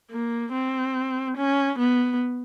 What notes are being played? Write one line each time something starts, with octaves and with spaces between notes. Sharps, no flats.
A#3
C4
C#4
B3